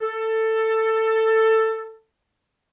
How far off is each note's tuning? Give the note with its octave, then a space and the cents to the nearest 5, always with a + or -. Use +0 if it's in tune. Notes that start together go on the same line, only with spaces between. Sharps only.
A4 +15